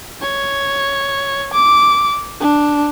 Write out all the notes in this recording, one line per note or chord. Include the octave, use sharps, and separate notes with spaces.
C#5
D6
D4